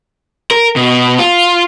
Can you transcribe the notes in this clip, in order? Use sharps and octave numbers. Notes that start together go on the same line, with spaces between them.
A#4
B2
F4